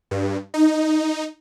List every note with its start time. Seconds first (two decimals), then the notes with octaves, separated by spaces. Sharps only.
0.11 G2
0.54 D#4